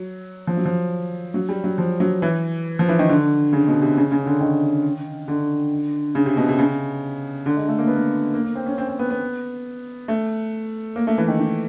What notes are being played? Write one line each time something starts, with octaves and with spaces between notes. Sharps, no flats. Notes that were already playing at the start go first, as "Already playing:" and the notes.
Already playing: F#3
F3
F#3
F3
F#3
G3
F#3
F3
F#3
E3
F3
E3
D#3
D3
C#3
B2
C3
C#3
C#3
D3
D#3
D3
C#3
C3
B2
C3
C#3
D3
G#3
A3
A#3
B3
A#3
A#3
A#3
C4
C#4
C4
C4
B3
B3
A3
A#3
A3
E3
D#3
D#3